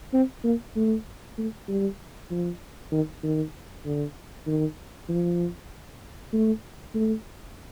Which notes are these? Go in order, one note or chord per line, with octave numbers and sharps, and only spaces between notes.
C4
A#3
A3
A3
G3
F3
D#3
D#3
D3
D#3
F3
A3
A3